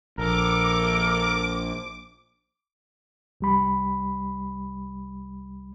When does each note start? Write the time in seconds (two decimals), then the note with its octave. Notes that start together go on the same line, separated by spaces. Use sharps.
0.18 A#1 A4 A#4 D6
3.41 C2 G3 B5